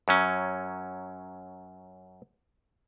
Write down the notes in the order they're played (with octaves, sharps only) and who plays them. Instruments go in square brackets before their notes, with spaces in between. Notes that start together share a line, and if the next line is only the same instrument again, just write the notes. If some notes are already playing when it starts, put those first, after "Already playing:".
[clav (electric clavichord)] F#2 F#3 C#4